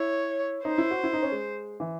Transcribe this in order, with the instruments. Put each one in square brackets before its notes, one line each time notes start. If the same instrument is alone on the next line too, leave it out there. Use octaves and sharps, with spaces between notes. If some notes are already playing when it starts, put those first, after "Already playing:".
Already playing: [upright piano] E4 [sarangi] C#5
[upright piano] D#4 [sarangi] C5
[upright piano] E4
F#4
E4
D#4
C#4
G#3
E3